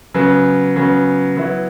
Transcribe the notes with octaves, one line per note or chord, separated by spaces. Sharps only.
C#3 F#3 B3
C#3 F#3 B3
F#3 B3 E4